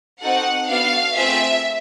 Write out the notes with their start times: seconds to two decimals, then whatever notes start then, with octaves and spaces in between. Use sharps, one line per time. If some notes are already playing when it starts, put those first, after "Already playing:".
0.21 C4 D#4 F#4 A4 F#5
0.69 B3 D4 F#4 A4 F5
1.15 A3 C4 F4 G#4 E5